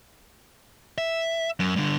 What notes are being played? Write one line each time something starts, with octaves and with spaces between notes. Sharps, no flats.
E5
F#2
G2 D3